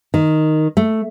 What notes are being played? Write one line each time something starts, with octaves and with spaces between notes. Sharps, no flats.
D#3
A3